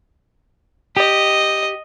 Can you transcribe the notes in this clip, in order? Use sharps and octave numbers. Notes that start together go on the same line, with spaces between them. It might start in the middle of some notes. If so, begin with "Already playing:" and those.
G4 D#5